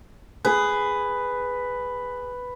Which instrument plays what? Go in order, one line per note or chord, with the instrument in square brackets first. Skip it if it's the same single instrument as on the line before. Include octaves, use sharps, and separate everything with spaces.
[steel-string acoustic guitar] G#4 [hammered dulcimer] B4